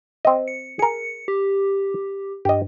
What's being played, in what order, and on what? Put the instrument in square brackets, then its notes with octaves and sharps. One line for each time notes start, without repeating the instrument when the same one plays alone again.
[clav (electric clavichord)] C4 D#5
[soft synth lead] C#7
[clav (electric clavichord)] G#4 A#4 [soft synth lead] C#7
[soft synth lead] G4
[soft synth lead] G2 [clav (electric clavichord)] G4 D#5